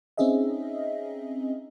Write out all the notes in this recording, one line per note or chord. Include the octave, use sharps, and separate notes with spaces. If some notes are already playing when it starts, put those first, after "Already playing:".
C4 C#4 D#4 G#4 D#5 E5